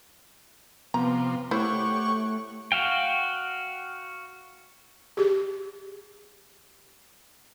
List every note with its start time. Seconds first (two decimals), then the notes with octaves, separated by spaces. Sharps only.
0.94 C3 F3 B3 A#5
1.51 A3 E4 G4 C5 C#5 F#5 C#6
2.72 F#4 F5 G5
5.17 G4 G#4